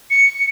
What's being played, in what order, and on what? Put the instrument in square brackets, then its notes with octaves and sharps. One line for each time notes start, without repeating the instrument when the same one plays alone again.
[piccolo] C#7